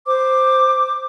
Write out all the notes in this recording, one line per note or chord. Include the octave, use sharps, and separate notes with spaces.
C5 D6